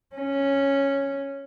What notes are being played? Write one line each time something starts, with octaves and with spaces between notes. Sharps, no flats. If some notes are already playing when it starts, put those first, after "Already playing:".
C#4